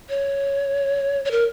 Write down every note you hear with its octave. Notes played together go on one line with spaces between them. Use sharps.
C#5
C#5
A#4